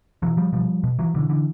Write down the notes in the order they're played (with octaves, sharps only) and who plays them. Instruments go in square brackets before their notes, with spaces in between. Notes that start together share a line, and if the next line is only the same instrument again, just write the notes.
[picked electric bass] B2 E3 F#3
F3 G3
B2 F3 G3
B2
E3 F#3
B2 D3 E3
D3 E3